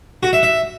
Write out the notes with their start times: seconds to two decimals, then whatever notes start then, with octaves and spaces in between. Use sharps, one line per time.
0.23 F#4
0.33 E5
0.43 E5